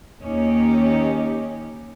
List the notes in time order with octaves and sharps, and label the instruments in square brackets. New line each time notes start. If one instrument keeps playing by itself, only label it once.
[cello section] D#2 C#4 D#4 G4